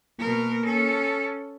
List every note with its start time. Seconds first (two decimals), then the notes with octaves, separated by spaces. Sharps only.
0.19 B2 A#3 A#4
0.65 C#4 A4